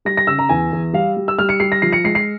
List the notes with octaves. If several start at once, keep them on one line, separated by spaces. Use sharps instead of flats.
G3 A#6
A#6
C#3 E6
A#5
E2 G#5
E2
G3 F5
G3
E6
G3 F6
C#7
G3 C7
A#6
F3 C7
C#7
G#3 C7
C7